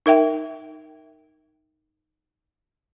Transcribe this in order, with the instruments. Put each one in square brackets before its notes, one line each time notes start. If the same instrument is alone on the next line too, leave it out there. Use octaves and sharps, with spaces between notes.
[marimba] D#4 A#4 E5 G5